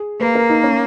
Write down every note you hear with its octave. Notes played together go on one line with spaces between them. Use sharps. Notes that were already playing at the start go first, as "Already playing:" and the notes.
Already playing: G#4
A#3 B4
A#4
D#4
C#4